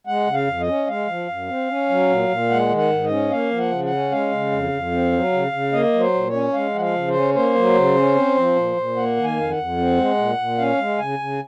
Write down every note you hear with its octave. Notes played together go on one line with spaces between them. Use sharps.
G#3 F#5
C#3
F5
F2
D#5
C#4
G#3 F5
F3
F#2
C4
C#4
F#3
A#2
A#2
G#3 F#5
D#3
F#5
G#2
D#5
C#4
A#3 F5
F3
F#5
C#3
F#5
C#4
G#3 F5
C#3
F2
F2
C4
F#3
C#3
C#3
A#3 D#5
F#3
C5
A#2
C#5
C#4
G#3 F5
F3 F#5
F5
C#3
C5
C#4
A#3 C5
F#3
C#3
C#4
C4
F3
A#2
A#2
A#3 F#5
D#3
G#5
F2 F5
F#5
F2
C4
G#3
A#2
A#2
C#4 F5
G#3
C#3 G#5
C#3